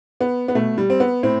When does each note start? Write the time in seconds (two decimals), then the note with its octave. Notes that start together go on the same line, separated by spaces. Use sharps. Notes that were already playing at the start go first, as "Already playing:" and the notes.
0.21 B3
0.48 B3
0.55 B2 A3
0.78 G3
0.90 C4
1.00 B3
1.23 A2 C4